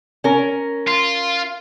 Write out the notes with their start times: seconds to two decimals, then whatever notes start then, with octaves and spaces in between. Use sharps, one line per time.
0.24 C#4 A#4
0.87 F4